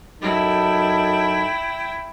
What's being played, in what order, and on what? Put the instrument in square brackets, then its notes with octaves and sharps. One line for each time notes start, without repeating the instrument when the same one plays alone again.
[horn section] F#2 D#4 A4 [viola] E4 G5